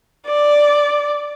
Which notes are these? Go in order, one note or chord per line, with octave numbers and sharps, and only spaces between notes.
D5